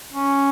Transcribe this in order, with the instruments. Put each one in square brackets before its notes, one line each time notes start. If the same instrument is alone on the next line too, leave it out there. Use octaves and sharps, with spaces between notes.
[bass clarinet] C#4